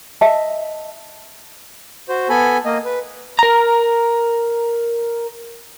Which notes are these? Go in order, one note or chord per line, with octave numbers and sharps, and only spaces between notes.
D#5 E5 A5
F#4 C5
B3 A4 G#5 B5
A#3 D#5
B4
A#4 A#5